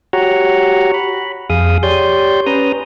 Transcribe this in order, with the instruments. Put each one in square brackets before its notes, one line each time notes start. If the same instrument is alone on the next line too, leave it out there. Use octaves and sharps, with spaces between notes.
[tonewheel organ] F#4 G4 C#5 F#5 A#5
B5
F2 G#4 F5 D#6
G4 C#5 D5 C6 G6
C#4 B4 A#5 D#6